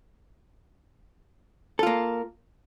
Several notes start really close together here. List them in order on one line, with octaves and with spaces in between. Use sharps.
A4 F4 A#3